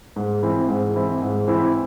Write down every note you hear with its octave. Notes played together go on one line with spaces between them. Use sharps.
G#2
E3 C4 E4
G#2
E3 C4 E4
G#2
E3 C4 E4